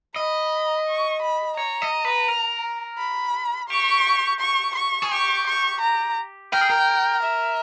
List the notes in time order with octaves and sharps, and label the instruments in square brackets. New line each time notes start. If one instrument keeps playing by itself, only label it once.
[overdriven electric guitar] D#5 [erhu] B5
[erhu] C#6
B5
[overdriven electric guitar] C#5 [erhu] A#5
[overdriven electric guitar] D#5
B4
A#4
[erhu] B5
[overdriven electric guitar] G4 [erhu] C#6
[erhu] C#6
C#6
[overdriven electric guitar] G#4
[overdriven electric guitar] G4 [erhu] C#6
[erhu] C#6
A#5
[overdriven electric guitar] A#4 [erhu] G5
[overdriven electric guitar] G#4
A#4
[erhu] E5